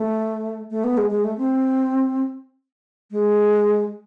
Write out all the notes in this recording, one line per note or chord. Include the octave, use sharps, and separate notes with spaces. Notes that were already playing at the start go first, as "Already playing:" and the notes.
Already playing: A3
A3
B3
G#3
G#3
A3
C4
G#3